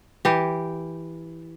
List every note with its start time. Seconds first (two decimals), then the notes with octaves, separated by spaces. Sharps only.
0.25 E3 G4